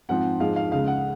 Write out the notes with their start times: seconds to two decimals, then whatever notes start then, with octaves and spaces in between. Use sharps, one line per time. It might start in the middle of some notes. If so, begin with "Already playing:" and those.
0.09 G#2 F3 C4 F#5
0.40 G#2 F3 G#3 F5
0.56 F5
0.71 C#2 C#3 G#3 F5
0.88 F#5